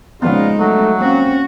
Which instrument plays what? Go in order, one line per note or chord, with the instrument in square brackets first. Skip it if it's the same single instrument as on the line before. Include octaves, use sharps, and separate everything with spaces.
[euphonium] A#2 [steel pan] C#3 F3 B3 [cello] G#3 D#4 [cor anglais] F4
[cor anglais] F#3 [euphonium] A3
[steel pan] A#3 [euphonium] C4 [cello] C#4 F#4